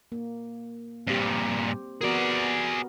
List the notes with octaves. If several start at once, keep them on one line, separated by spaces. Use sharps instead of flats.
A#3
G2 A#2 C4 G4
B3 F#4 G#4 A#4 D5